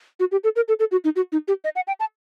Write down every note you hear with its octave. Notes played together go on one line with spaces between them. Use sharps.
F#4
G4
A4
A#4
A4
A4
F#4
D#4
F#4
D#4
G4
D#5
F#5
G5
A5